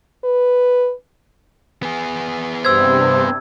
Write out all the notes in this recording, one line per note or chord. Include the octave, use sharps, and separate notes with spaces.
B4
B3 G#4
G2 C3 C5 E6 G#6